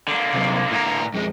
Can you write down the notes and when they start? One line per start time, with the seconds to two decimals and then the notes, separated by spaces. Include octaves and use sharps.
0.08 D3 A#3
0.34 C3 F#3
0.71 A2 A#5
1.14 F2 G#3